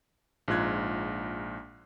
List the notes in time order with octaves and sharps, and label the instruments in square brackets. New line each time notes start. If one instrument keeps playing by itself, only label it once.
[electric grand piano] A#1 G#2 F4 F#6 G#6